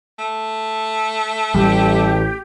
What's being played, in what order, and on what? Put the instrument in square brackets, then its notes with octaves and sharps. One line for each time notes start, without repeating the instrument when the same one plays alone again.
[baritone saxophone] A3
[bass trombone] A1 [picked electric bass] G3 [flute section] G4